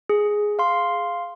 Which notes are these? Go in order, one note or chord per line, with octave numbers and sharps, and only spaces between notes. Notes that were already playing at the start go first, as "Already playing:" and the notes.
G#4
F5 C6